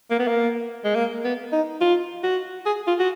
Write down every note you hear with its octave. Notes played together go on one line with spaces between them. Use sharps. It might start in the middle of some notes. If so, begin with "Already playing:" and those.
A#3
B3
A#3
G#3
A#3
B3
D#4
F4
F#4
G#4
F4
F#4